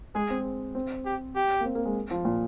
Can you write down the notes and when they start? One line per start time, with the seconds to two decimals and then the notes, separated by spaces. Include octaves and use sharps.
0.15 G#3 G#4
0.30 C4
0.75 C4
1.05 G4
1.36 G4
1.60 A#3
1.65 C4
1.75 A#3
1.85 G#3
2.11 F3
2.25 A#2